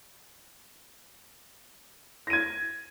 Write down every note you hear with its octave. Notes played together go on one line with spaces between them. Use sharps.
G#6 A#6 D#7